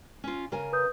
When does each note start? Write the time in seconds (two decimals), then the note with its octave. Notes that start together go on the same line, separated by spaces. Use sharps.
0.24 C#4 F4
0.52 C#3 A#4 G#5
0.73 B4 D#6 G6